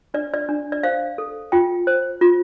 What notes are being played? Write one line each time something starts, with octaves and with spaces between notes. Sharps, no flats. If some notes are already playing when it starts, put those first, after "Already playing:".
D4 D5
D5
D4
D5
C5 F5
A4
F4 G5
C5
F4